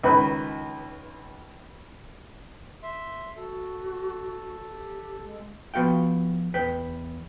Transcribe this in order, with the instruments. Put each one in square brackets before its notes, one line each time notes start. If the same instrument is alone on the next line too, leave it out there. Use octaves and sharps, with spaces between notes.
[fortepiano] C#2 D#3 B4 B5
[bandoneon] E5 C6
[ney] F#4 [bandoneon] A4
[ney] G4
G#3
[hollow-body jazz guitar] F3 B3 F#4 F5 G5
E2 B4 G5